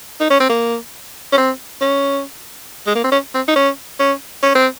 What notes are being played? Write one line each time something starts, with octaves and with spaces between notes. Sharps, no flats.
D#4
C#4
C4
A#3
C#4
C4
C#4
G#3
A#3
C4
C#4
C4
D#4
C#4
C#4
C#4
C4